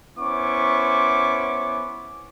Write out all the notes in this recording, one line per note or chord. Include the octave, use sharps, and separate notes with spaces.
B3 C#4 E4 C5 C#6 D6